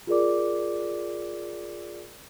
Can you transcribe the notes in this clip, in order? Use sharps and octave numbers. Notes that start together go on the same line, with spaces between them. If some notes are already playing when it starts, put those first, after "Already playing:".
F4 G#4 A#4 D5 D6